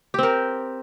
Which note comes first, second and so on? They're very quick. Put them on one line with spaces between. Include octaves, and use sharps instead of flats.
G4 C4 A#4